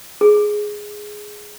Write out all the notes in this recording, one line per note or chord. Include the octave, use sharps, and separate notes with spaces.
G#4